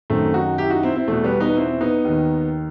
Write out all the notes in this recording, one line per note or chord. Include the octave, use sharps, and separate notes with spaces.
F#2 D#3 A3 C4
D#4 F#4
E4 G4
D#4 F#4
C4 E4
C4 E4
E2 B2 A3
G3 B3
B3 D#4
C4 E4
B3 D#4
D#2 D#3